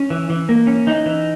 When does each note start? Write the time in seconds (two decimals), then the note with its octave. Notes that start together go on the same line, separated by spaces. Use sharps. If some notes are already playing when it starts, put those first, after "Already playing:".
Already playing: C#4
0.10 E3
0.30 E3
0.49 A#3
0.67 C#4
0.87 E3 D#4
1.06 E3